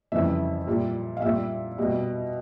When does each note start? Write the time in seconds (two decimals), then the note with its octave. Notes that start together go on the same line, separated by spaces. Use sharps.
0.12 F2 C#3 E3 G3 E5
0.67 A#2 G3
1.17 F5
1.22 A#2 G3 E5
1.78 B2 G3